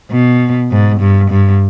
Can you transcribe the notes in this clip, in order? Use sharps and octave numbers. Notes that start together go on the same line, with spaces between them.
B2
G#2
G2
G2